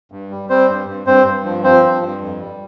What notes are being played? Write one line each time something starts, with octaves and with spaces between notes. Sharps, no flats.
G2
G3
G3 C4 C5
G2
G2
G2 C4 C5
G2
F3
F3 C4 C5
G2
G2
F2
G3